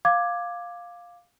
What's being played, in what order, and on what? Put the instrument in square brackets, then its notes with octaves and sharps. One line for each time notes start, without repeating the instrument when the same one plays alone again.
[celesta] F5 D6 G#6